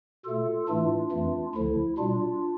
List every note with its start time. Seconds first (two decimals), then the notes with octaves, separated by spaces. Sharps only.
0.25 B2 A3 F4 A4
0.68 A2 E3 A3 D4 F4
1.12 F2 E3 A3
1.55 D2 D3 F3 E4
1.98 B2 G3 D4 F4